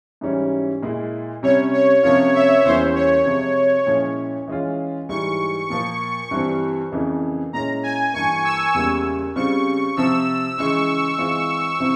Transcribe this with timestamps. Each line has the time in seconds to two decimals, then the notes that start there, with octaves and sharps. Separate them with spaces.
0.21 G#2 E3 G3 C#4 E4
0.83 A#2 G#3 E4
1.43 C3 G3 C#4 C#5
1.73 C#5
2.03 C3 F3 A#3 C#4 F4 C#5
2.34 E5
2.65 E2 E3 G3 A#3 C#4 C5
2.95 C#5
3.26 C3 F3 G#3
3.86 A#2 F3 G#3 C#4 E4
4.47 E3 G#3 C#4 F4
5.09 G#2 E3 G3 C#6
5.70 A#2 F3 A#3 C#6
6.31 G2 E3 G3 C4
6.92 F2 C#3 E3 A#3
7.53 A#2 G#3 C#4 E4 A#5
7.83 G#5
8.14 G2 E3 A#3 C#6
8.44 E6
8.74 E2 C#3 G3 A#3 E6
9.36 C#3 G3 C4 F4 C#6
9.96 C3 F3 C4 E6
10.58 C#3 E3 G#3 C#6
11.18 E3 G#3 C4 F4
11.80 C3 F3 C4 E4